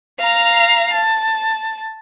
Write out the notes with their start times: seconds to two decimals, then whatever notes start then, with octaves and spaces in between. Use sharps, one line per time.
0.20 F5 A#5
0.93 A5